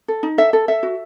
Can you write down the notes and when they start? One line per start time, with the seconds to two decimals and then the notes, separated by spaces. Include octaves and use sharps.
0.08 A4
0.23 D#4
0.38 A4 E5
0.53 A4
0.68 A4 E5
0.83 F#4